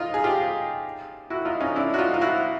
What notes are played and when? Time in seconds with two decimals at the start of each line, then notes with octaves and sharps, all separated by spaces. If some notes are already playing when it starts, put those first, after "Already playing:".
Already playing: D#4 F4
0.14 G#4
0.24 F4 G4
1.30 E4 F#4
1.45 D#4 F4
1.60 C#4 D#4
1.76 D4 E4
1.94 F#4
1.98 D#4 F4
2.14 F4
2.21 E4 F#4